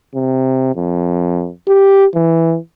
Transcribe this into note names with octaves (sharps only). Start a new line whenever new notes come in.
C3
F2
G4
E3